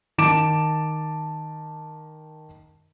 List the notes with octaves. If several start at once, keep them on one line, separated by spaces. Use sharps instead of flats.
D#3 A5 D6 D7 E7